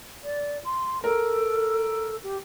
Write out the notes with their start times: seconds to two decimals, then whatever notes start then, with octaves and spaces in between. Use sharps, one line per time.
0.24 D5
0.65 C6
1.04 A4 A#4
2.24 G4